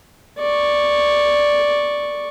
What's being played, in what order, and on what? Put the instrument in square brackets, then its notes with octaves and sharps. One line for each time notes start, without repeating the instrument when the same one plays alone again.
[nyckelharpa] D5 C#6